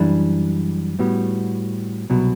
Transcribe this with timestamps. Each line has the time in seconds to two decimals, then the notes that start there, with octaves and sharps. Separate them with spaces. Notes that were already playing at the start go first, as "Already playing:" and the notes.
Already playing: F#2 E3 G3 D4
0.99 A2 G3 B3 F#4
2.10 C2 B2 F#3